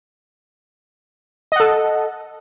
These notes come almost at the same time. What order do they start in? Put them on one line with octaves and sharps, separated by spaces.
D#5 F#5 A4